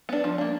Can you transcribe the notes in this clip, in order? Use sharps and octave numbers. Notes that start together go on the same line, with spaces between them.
B3 D4
F3
A#3 D4